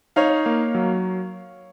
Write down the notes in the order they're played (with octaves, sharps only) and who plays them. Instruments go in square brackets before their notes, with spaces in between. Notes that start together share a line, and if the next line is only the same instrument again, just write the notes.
[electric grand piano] D#4 [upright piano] C#5 F5
[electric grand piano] A#3
F#3